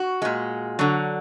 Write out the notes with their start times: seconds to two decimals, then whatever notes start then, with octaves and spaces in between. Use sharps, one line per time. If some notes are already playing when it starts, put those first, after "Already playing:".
Already playing: F#4
0.22 A#2 G#3
0.79 D3 F#3